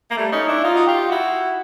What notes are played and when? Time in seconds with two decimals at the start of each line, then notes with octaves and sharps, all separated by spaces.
0.10 A#3
0.16 G3 A3
0.32 C#4 D#4
0.48 D4 E4
0.63 D#4 F4
0.75 F#4
0.86 F4 G4
1.09 E4 F#4